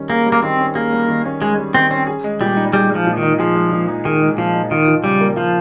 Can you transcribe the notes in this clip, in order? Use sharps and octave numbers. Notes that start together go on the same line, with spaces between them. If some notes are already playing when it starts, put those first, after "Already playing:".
Already playing: D#3 G3 C#4
A#3 G#4
G3
A#3
D#3 C4
C#4
A#3 G#4
G3
D#3
C#4
G#3 G#4
G3
D#3 C4
C4 C#4
G#4
G#3
A#2 G3
D#4
G3 G#4
G#3
F3
A#2
D#3
D#4
F3 G#4
G#3
A#2
D#4
D#3 G#4
G#3
A#2 F3
D#4
D#3 F4
F3
C#3 G3
A#3
F3 F4